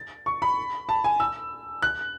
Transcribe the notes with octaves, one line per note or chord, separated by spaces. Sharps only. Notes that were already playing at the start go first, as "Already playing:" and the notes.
Already playing: A6
C#6
B5
A5
G#5
E6
F#6